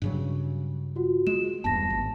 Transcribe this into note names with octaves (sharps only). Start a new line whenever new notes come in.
G2 C#3 F#3
F4 F#4
G#3 E7
D#1 E2 G2 A5 A#6
G#1